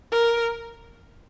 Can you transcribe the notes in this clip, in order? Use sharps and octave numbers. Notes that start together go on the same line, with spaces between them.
A#4